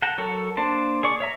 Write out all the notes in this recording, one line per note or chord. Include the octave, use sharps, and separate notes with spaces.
F#5 G5 A5 A#5
F#3 A4 A#4 C#5
A#3 D4 C5 A5
G#4 D5 C#6
C#5 E5 A#5